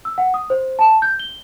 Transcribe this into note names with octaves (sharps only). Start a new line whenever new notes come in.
E6
F#5
D#6
C5
A5
G6
G7